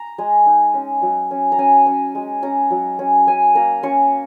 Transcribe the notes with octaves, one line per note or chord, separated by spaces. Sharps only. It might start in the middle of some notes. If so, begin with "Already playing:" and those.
Already playing: A#5
G#3
D#4
C#4
F#3
C#4
A#5
C#4 G#5
C#4
G#3
C#4 A#5
F#3
C#4
C#4 G#5
A#3 A#5
C#4 C#6